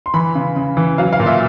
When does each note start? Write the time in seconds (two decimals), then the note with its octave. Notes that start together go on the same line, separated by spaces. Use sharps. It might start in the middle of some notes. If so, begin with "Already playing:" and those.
0.06 C6
0.14 E3 B5
0.35 C#3
0.56 C#3
0.77 E3
0.98 F#3 F5
1.13 F5
1.19 A#2
1.26 E5